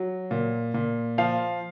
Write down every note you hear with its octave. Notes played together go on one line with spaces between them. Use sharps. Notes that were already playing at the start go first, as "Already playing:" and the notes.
Already playing: F#3
A#2
A#2
F3 F5